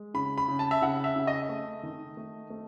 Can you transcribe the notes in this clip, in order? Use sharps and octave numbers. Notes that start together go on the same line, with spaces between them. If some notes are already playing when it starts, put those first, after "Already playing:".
Already playing: G#3
C#3 B5
B5
C#3
A5
E5
C#3 F#5
E5
C#3
D#5
A3
D#3
A3
A3